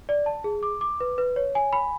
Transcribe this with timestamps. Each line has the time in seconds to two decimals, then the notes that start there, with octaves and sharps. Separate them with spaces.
0.09 D5
0.26 A5
0.44 G#4
0.63 D6
0.81 D6
1.00 B4
1.18 B4
1.36 C#5
1.55 G#5
1.73 B5